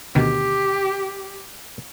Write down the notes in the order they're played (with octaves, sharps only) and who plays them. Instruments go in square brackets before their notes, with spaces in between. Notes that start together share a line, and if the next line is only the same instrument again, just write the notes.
[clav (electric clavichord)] D2 B2 D#3 [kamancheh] G4